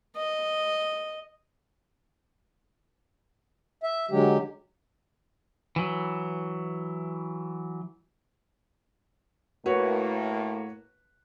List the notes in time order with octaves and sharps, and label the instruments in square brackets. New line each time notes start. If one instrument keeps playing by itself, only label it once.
[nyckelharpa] D#5
[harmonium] E5
D3 F#3 G#3 G4
[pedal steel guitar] E3 F#3
[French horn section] A2 A#3 [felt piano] F#4 B4 C#5